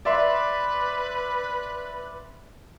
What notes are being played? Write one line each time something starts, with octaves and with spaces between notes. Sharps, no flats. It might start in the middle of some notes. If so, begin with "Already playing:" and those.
B4 D5 E5 C6